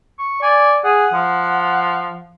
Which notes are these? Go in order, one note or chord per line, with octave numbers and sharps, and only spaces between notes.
C#6
D5 G#5
G#4 F#5
F3